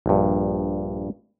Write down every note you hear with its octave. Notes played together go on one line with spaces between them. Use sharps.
A#1 G2